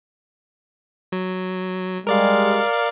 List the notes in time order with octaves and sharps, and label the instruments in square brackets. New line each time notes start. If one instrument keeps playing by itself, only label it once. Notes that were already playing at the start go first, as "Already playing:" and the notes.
[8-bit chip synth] F#3
[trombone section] G3 G#3 [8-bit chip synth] A#4 D5 F5